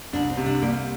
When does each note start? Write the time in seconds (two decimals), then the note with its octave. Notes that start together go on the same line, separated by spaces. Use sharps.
0.13 C2 D4
0.30 C4
0.37 C3
0.46 D4
0.62 G3 A#3